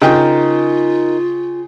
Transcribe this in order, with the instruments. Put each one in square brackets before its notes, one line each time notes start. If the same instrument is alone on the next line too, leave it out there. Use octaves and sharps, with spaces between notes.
[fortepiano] C#3 G5 [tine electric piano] D#4 A#4 [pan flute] F4